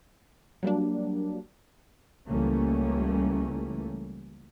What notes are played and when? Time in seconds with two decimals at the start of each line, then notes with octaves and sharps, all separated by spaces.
0.63 F#3 G3 A#3 D4
2.29 C#2 E3 G3 A3 A#3 C#4